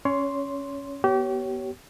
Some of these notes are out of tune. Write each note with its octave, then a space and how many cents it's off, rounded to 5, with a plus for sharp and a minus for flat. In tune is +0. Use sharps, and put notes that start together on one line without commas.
C#4 +0 C#5 +25 C6 +0
B3 -20 G4 -35 C#5 +0